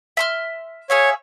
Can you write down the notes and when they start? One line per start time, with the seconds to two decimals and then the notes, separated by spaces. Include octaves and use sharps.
0.17 E5 C6 F6
0.90 G#4 C#5 E5 F5